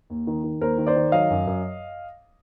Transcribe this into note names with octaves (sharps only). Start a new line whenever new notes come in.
D#2
D#3
D#3
D#2 A#4 C5
D#3
C5 D5
D#3
F#3 D#5 F5
F#2
F#2